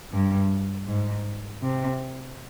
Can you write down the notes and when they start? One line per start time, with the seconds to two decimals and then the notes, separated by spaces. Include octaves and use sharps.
0.13 G2
0.87 G#2
1.62 C3